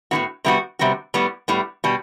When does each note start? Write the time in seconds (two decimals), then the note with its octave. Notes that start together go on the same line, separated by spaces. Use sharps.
0.11 A2 E3 B3 F#4
0.45 C3 G3 B3 F#4
0.79 C3 G3 B3 F#4
1.14 A2 G3 B3
1.48 A2 G3 B3
1.84 B2 G3